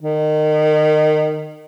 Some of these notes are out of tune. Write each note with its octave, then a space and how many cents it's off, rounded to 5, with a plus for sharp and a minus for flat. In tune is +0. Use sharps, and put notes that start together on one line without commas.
D#3 -25